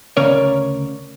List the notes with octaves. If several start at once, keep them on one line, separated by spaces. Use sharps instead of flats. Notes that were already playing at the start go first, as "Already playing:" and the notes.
D2 C#3 C#4 A#4 C#5 D5